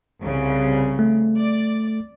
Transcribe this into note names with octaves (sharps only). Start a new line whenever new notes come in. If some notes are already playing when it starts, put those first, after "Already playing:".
C2 C#3
A3
D5